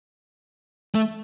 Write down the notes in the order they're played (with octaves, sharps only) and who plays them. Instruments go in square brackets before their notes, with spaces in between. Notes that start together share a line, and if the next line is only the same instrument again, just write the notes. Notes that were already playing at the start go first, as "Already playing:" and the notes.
[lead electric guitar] A3